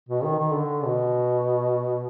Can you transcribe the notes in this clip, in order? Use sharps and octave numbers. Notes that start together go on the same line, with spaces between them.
B2
D#3
D#3
D3
B2